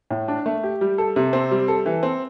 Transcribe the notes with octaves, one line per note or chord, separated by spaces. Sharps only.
A2
D4
A3
G4
G3
A4
C3
C4
G3
A4
E3
C4